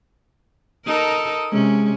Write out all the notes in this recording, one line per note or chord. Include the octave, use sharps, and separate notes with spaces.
D#4 A4 A#4 D#6
C3 G#3 C#4